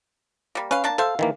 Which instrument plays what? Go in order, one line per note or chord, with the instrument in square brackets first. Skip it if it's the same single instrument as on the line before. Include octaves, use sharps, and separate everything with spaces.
[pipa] G3 A#3
[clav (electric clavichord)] C#4 [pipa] B4 F5
[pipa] A#3 D4 A5
[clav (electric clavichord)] A4 C5 [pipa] E5 F5
[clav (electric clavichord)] D#3 E3 A#3